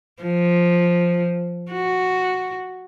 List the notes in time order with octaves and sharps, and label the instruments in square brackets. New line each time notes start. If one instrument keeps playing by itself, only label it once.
[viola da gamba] F3
F#4